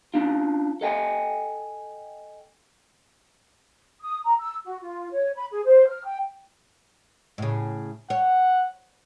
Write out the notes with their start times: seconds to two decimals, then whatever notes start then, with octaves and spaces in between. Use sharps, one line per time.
0.14 C#4 D4 F4
0.81 A4 D#5 G5 G#5
4.01 D#6
4.24 A#5
4.39 E6
4.64 F#4
4.81 F4
5.11 C#5
5.35 B5
5.50 G#4
5.65 C5
5.88 F6
6.05 G5
7.38 A2 C#3
8.10 C#5 F#5